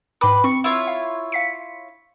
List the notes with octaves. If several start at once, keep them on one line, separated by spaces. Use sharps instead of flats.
G#2 B4 G5 D6
C4 C#6
E4 F4 C#5
F5
F5 B6 C#7